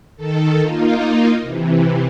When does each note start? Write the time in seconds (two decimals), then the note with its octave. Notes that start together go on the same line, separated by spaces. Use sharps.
0.16 D#3 A4
0.62 A#3 D#4 F4
1.42 C3 E3